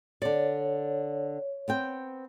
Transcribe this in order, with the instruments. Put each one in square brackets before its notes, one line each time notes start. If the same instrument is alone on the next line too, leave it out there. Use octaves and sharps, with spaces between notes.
[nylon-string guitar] D3 D5 [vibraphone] C#5
[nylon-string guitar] B3 C4 G5